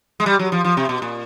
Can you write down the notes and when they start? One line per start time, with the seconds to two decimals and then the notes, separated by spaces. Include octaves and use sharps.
0.20 G#3
0.26 G3
0.39 F#3
0.52 F3
0.64 F3
0.77 C3
0.89 B2
1.02 A#2